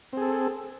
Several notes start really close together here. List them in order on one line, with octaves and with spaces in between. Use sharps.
C4 G#4 A4